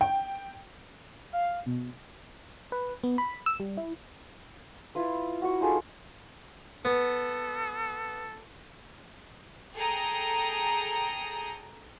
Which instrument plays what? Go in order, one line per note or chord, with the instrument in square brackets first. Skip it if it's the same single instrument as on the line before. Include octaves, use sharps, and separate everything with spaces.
[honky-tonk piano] G5
[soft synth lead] F5
B2
[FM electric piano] B4
B3
B5
E6
G3
E4
[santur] E4 F4 B4
F#4 C#6
D#4 F4 G#4 A4
[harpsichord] B3 [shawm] A4
[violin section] G#4 A4 G5 A#5 D#6